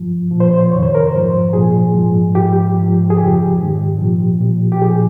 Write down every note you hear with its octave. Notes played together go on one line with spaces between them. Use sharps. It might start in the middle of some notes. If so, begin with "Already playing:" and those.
Already playing: G2 F3
A#2 F3
C5
C5
F2 C3 D#3 C#5
C5
A#4
C5
G#2 F3
A#2 F3 G#4
G#2 F3
G#2 F3 G4
G#2 F3
G#4
F2 C#3 F3 G4
G#2 D#3
A#2 F3
A#2
F3
G4
A#2 F3 G#4